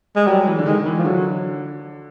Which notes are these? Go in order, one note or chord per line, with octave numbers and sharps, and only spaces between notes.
G#3
F#3 G3
E3
D3
D#3 G#3
E3
F3
D3 F#3